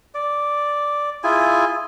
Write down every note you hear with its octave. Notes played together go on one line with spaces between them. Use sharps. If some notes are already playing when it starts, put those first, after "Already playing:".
D5
E4 F4 G#4 G#5